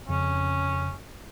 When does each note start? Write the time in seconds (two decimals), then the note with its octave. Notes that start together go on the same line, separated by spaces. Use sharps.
0.09 F2 C#3 C#4